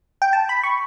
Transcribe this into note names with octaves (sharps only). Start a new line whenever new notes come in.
G5
A5
B5
C#6